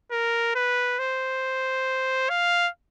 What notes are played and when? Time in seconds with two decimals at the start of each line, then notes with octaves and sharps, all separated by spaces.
0.11 A#4
0.55 B4
0.99 C5
2.29 F5